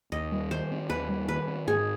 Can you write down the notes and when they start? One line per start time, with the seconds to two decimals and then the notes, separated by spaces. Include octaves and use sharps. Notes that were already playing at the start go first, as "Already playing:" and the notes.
0.12 D#2 D#5
0.32 G3
0.51 D#3 C5
0.71 C4
0.89 D#2 B4
1.09 G3
1.28 D#3 B4
1.48 C4
1.67 G#2 G#4